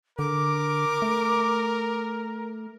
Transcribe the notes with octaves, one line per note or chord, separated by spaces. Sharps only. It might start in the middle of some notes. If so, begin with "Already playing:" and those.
D3 A#4 D6
A3